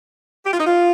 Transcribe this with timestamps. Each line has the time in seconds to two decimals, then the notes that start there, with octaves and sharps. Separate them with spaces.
0.45 G4
0.53 F4
0.60 D#4
0.66 F4